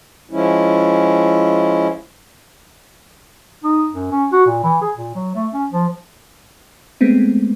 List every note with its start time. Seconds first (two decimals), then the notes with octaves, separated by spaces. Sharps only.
0.31 F3 G#3 C#4 E4
3.64 D#4
3.93 F#2
4.12 C#4
4.32 F#4
4.46 A#2
4.63 E3
4.82 G#4
4.95 A#2
5.15 F#3
5.35 A3
5.53 C#4
5.72 F3
7.01 G#3 A3 B3 C4